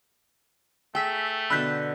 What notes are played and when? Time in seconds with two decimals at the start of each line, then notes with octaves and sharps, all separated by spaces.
0.95 A3 G#4 G5 B5 C#6 E6 B6
1.50 B2 D3 D4 B5 E6 F#6 G6 B6